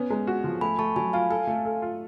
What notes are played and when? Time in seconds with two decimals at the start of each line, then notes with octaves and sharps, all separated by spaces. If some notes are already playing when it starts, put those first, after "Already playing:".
Already playing: B3 C#4
0.10 G#3
0.27 F#4
0.44 F3
0.61 A3 G#5 B5
0.78 A3 A5 C#6
0.96 F#3 G#5 B5
1.13 F4 F5 G#5
1.30 A4 F5 G#5
1.47 A3
1.65 A4
1.82 F4